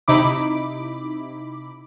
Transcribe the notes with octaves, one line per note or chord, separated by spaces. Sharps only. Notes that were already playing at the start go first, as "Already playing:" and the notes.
C3 D#4 E4 B5 D6